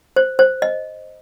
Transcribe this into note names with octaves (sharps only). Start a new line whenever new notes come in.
C5
C5
D#5